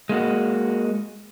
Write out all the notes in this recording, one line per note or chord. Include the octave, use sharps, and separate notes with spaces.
G#3 A#3 E4 F#4